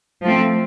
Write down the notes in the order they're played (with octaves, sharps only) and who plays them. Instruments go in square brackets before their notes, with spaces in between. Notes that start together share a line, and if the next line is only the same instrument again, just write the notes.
[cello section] F3 A3 C4